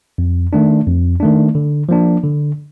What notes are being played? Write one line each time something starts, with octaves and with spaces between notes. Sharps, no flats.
F2
D#3 A3 D4
F2
D#3 A3 D4
D3
F3 A#3 D4
D3